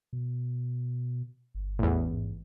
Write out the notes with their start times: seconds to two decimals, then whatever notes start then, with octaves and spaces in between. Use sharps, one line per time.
0.13 B2
1.55 G1
1.79 A1 E2
2.10 G#2